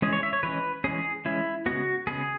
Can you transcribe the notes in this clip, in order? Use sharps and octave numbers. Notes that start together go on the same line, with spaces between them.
E3 G#3 C#4 G#4
C#5
E5
C#5
E3 G#3 C#4 B4
E3 G#3 C#4 G#4
E3 G#3 C#4 E4
C#3 G#3 B3 F#4
C#3 G#3 B3 G#4